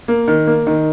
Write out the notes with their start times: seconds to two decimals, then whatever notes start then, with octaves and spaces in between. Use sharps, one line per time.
0.08 A#3
0.28 D#3
0.47 A#3
0.67 D#3